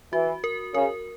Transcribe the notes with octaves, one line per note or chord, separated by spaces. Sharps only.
E3 F#4
A#4
C#3 A#4